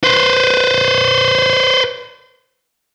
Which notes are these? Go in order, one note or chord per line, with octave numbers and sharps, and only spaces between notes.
B4 C5